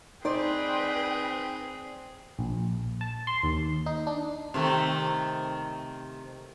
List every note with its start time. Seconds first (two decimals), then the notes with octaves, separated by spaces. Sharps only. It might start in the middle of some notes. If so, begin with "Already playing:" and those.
0.25 C4 D#4 G#4 B4 C5 D5 G5
2.39 A#1
3.01 A5
3.27 C6
3.43 D#2
3.86 D#4
4.07 D4
4.54 C3 D#3 A3